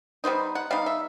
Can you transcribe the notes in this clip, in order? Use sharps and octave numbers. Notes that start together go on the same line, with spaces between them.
G3 B3 D#4 C5
F#5
G3 B3 D#4 F5
E5